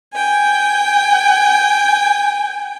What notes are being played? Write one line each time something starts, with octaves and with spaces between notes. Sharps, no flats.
G5 G#5